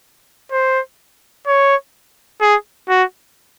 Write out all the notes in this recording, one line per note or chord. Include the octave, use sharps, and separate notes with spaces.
C5
C#5
G#4
F#4